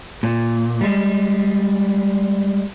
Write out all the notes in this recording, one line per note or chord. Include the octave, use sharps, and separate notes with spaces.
A#2
G3 G#3